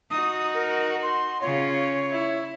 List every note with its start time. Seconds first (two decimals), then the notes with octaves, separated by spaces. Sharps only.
0.11 D#4 F#4 D#6
0.54 A#4
1.03 C6
1.41 C#3 C#4 F4 C#5
2.11 E4